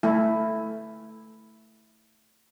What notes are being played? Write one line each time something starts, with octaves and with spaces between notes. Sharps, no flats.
A3 E4